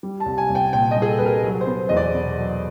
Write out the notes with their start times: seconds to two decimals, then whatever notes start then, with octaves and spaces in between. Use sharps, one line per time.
0.03 G3
0.20 A5
0.26 C2
0.38 G#5
0.50 C2
0.55 G5
0.73 A#2 G5
0.91 D#5
0.96 G3
1.02 G#4
1.08 A4
1.18 C2 B4
1.26 A#4
1.44 F#3
1.61 C5
1.67 B3
1.89 E2 D#5
1.97 D5
2.14 B2
2.38 F#3